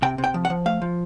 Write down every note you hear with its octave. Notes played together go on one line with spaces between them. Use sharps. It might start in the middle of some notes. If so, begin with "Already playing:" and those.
C3 G5
C3
G5
F3
F#5
F3
A3 F5
F3